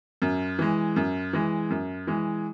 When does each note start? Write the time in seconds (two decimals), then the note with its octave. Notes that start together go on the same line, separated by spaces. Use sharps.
0.22 F#2
0.59 E3 G#3
0.96 F#2
1.33 E3 G#3
1.70 F#2
2.07 E3 G#3